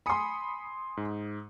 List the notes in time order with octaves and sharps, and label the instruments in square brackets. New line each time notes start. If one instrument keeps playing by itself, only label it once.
[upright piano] G#5 C6 [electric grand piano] B5 D#6 C#7
[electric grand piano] G#2